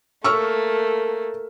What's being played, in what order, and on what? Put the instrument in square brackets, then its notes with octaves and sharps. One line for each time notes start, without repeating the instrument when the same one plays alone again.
[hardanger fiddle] A3 A#3 [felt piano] C#6 E6 F6